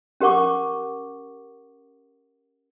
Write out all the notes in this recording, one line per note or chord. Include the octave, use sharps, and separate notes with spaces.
C#4 G4 A#4 F#5 C#6 D6